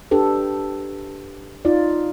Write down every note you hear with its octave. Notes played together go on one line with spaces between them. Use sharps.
D4 G4 A4 B4
D#4 F4 D5